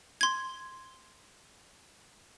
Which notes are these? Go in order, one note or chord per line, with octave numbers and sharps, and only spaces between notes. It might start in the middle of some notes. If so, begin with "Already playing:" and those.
C6 G#6